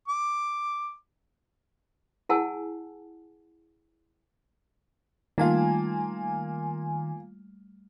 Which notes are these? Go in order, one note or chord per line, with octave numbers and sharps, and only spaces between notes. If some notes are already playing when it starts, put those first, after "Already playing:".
D6
E4 G#4 F#5 G#5 A5 E6
D#3 G3 A3 A#3 F4 G#5